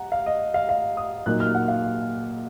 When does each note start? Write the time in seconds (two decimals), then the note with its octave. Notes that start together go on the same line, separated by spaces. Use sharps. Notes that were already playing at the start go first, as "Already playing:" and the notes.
Already playing: F#5 A#5
0.12 F5
0.26 D#5
0.54 F5
0.69 F5
0.97 D#6
1.26 A#2 F#3 A#3 D#4 F#6
1.40 F6
1.55 F#5
1.68 F5